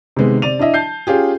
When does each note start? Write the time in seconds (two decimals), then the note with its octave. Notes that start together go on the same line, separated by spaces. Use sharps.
0.17 C3 D#3 G#3 B3
0.42 C3 D5 D#7 F7
0.59 D4 E4 D#5 E5
0.74 A5 G6 C7
1.07 C#4 F4 G4 G#4